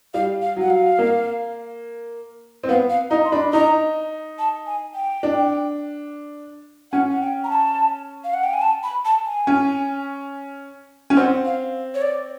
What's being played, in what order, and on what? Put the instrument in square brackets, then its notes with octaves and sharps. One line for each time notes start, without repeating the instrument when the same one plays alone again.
[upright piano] G3 [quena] F5
[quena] F5
[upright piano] F#3
[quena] F#5
F5
[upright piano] A#3
C4
[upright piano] B3 [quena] F5
[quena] F5
[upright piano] D#4 [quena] A#5
[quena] C6
[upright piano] D4 [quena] B5
[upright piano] D#4 [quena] A#5
[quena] A5
G#5
G5
[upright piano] D4
[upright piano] C#4 [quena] F#5
[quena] F#5
G5
A#5
A5
F5
F#5
G5
G#5
A5
B5
A5
G#5
[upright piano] C#4
C#4
[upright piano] C4 [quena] F#5
[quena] F5
C#5
D5